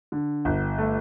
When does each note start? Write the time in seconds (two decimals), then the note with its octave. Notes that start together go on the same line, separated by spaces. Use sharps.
0.12 D3
0.45 G1
0.78 A3